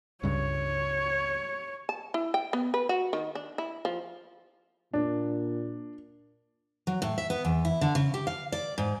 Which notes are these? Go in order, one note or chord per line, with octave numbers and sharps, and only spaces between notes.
C#2 G2 C#5
A5
E4
G5
B3
B4
F#4
D#3
D4
E4
F3
A#2 D4
F#3
A2
E5
B3
E2
E4
D3
C#3
G4
F5
D5
G#2